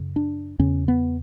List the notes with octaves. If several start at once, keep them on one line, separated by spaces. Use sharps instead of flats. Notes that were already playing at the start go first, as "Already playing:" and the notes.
Already playing: F#2 C#3
D4
E2 C#3 C#4
B3